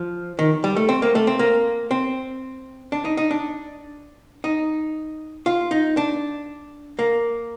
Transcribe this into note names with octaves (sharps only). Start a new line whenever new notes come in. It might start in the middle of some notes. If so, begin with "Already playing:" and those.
Already playing: F3
D#3
G3
A3
C4
A#3
A3
C4
A#3
C4
D4
D#4
D#4
D4
D#4
F4
D#4
D4
A#3